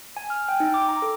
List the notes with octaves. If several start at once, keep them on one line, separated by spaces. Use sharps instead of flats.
G#5
F6
G5
D#4
D6
A#5
A4